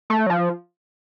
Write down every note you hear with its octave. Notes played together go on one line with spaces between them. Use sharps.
A3
F#3
F3